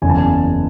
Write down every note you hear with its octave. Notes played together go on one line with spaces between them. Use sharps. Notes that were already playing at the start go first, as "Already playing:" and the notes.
F#1 E2 C#3 G#5
A5
G#5